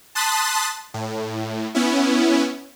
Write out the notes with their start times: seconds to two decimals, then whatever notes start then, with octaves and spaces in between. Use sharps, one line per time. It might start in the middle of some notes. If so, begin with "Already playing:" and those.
0.15 A5 C6 D#6 F#6 A6 B6
0.94 A2
1.75 B3 C#4 E4